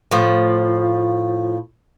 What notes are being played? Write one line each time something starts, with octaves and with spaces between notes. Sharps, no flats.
A2 F3